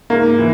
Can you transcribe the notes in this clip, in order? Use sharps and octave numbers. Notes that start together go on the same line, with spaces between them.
G#2 A#3
E3